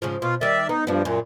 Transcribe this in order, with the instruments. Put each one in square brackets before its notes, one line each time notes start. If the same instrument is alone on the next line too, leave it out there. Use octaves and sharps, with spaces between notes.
[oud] G#2 C#3 F3
[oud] B2 [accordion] F4
[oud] D#3 G3 [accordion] D5 E5
[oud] B3 [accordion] D#4
[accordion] G2 F3 [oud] B3 D4
[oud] F#2 [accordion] A#2